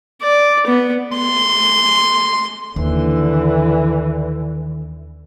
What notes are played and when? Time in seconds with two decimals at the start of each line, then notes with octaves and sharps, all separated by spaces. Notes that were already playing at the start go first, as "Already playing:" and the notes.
0.22 D5
0.67 B3
1.17 C6
2.76 D#2 D3 E3